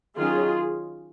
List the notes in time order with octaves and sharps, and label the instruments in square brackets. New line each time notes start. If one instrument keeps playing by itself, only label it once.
[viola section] D#3 F#3 C#4 F4 G#4